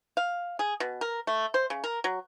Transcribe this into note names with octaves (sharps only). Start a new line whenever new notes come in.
F5
G#4
B2
A#4
A3
C5
C#3
A#4
F#3